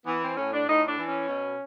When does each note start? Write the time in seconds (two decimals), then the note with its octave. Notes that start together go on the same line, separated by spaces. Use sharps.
0.06 E3 B3
0.22 C4
0.37 A2 C#4
0.52 D4
0.67 A2 D#4
0.88 D4
0.98 E3
1.08 C#4
1.28 B2